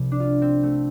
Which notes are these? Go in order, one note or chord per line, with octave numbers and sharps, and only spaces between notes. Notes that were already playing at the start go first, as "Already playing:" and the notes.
Already playing: C2 C3 F3
D4
F4
C4
A3